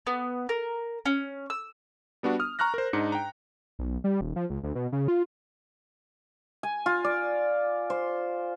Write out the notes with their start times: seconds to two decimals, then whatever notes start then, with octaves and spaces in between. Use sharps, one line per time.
0.07 B3
0.49 A#4
1.06 C#4
1.50 E6
2.23 G3 B3 D4 F#4
2.40 D#6 F6
2.59 A#5 C#6 F6 F#6 A#6
2.74 A#4 C5
2.93 G#2 D4 D#4 C#7
3.12 G5 A#5
3.79 B1
4.04 G3
4.21 D#1
4.36 F3
4.50 C#2
4.63 D2
4.75 B2
4.92 C#3
5.08 F4
6.63 G#5
6.86 F4
7.04 D5
7.90 C5